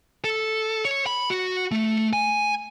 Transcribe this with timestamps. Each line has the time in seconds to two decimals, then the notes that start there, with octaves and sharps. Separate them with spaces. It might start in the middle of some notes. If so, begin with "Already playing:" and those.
0.24 A4
0.85 C#5
1.06 B5
1.30 F#4
1.71 A3
2.13 G#5